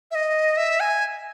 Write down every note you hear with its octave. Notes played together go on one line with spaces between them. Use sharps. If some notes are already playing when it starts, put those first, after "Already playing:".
E5
D#5
E5
G#5